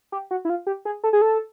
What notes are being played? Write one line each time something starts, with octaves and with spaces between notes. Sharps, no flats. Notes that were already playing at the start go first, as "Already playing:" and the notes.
G4
F#4
E4
F4
G4
G#4
A4
G#4
A4